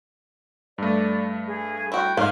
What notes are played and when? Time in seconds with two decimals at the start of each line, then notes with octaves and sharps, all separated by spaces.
0.78 G2 A3 D5
1.47 G#4
1.92 E4 F#4 G5
2.17 G#2 A#3 F4 F5 F6